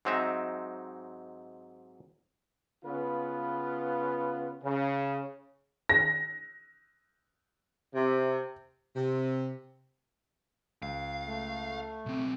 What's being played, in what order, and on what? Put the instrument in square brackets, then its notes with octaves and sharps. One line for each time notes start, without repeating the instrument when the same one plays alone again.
[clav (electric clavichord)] G#2 F#3 C4 D#4 E5
[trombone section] C#3 B3 F4 B4
C#3
[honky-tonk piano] A#6
[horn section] C3
C3
[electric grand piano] C#2 [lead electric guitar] F5
[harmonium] A3
[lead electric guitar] B1 C4